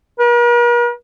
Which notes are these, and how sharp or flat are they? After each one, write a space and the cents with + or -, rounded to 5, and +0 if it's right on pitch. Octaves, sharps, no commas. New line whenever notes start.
A#4 +45